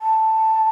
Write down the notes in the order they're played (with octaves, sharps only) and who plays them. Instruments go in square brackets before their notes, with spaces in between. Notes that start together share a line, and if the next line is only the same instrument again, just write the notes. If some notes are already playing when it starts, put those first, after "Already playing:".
[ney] A5